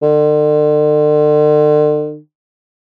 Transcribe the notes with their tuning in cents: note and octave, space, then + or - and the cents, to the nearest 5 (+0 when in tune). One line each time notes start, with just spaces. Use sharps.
D3 +40